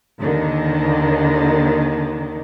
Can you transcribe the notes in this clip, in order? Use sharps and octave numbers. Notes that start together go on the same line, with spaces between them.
D#2 D3 D#3